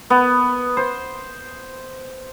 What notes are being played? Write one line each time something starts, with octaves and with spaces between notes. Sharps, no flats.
B3
C5